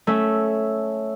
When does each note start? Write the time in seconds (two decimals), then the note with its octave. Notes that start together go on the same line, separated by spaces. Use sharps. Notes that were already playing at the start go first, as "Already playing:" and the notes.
0.07 A3 C#4 E5